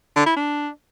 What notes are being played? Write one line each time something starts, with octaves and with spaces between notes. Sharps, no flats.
D3
E4
D4